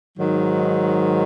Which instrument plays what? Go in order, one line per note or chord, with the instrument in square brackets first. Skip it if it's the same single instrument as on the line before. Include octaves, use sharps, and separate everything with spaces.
[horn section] G#2 D#3 F#3